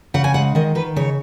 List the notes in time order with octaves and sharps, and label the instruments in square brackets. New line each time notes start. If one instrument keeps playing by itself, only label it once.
[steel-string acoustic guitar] C#3 F#5
G#5
G#3 F#5
D#3 D#5
D#3 B4
C#3 C#5